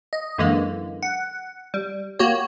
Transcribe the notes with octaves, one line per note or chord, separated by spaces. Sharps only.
D#5
F#2 D3 E3 G#3 A#3
F#5
G3
A#3 F#4 G4 C#5